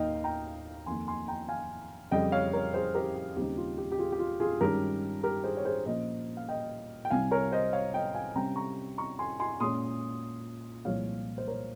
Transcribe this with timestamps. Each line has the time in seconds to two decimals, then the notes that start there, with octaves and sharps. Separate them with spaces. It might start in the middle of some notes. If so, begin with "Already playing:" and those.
Already playing: D#2 D#3 A#3 D#4 D#5 F5 G5
0.24 G5 A#5
0.86 F2 D#3 A#3 G#5 C6
1.08 G#5 C6
1.28 G5 A#5
1.49 F5 G#5
2.11 F2 C#3 G3 D#5 G5
2.32 C#5 F5
2.53 A#4 C#5
2.74 G#4 C5
2.95 G4 A#4
3.16 G4
3.36 D#2 C#3 G3 C4 D#4 G4
3.57 F4
3.78 G4
3.92 G4
3.98 F4 G#4
4.12 G4
4.19 F4
4.40 F4 G#4
4.61 G2 D#3 G#3 C#4 G4 A#4
5.23 G4 A#4
5.44 G#4 C5
5.57 C#5
5.65 G#4 C5
5.86 A#2 F3 A#3 C#4 C5 D#5
6.37 F5
6.48 D#5 G5
7.05 G5
7.10 C2 C3 G3 F5 G#5
7.31 A#4 C#5
7.52 C5 D#5
7.73 C#5 F5
7.94 D#5 G5
8.15 F5 G#5
8.36 C3 G3 C#4 G5 A#5
8.56 A#5 C#6
8.98 A#5 C#6
9.19 G#5 C6
9.40 G#5 C6
9.60 A#2 G#3 C#4 C6 D#6
10.85 C2 A#2 F3 G#3 C#5 F5
11.38 C5
11.48 A#4 C#5